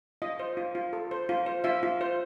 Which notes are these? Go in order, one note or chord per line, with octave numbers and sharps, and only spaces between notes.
F4 D#5
C5
F4
F4
A4
C5
F4
C5
F4 E5
F4
C5